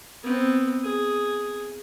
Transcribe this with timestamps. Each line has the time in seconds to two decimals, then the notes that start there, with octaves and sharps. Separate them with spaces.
0.23 B3 C4
0.84 G#4